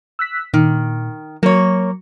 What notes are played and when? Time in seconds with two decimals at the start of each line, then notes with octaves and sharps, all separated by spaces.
0.19 E6 F#6 B6
0.54 A#2 D#3
1.43 F#3 A#3 C#5